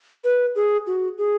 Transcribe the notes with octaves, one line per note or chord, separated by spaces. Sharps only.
B4
G#4
F#4
G#4